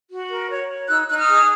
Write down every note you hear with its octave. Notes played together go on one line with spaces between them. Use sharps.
F#4
A#4
C#5
C#5
D#4 E6 F#6
D#4 F#6
D#6 F6
G#4